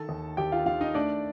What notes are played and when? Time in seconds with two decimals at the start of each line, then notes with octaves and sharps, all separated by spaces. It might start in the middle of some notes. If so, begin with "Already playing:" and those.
Already playing: D#3 A4 A5
0.09 D#2
0.37 D#2 G4 G5
0.52 F4 F5
0.66 D#3 F4 F5
0.81 D#4 D#5
0.94 A3 D4 D5